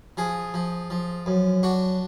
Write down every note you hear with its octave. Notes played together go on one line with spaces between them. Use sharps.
F3 G#4
F3
F3
F#2
D4 F#4